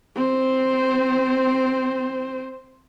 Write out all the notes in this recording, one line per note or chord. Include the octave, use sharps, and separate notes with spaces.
C4 C5